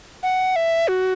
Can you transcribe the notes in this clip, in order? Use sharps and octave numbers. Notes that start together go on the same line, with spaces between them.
F#5
E5
F#4